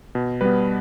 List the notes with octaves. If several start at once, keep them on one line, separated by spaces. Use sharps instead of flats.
B2
G3 B3 B4